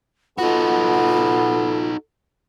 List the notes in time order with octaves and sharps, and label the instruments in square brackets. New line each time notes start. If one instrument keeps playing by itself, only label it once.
[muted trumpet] B3 [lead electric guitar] D#4 F#4 [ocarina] F4 [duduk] A4